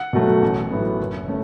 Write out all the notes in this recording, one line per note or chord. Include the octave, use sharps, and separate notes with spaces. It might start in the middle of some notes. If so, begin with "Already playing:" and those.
Already playing: F#5
B2 F#3 A3
A1
A2 F#3 B3
F#1
A3 C#4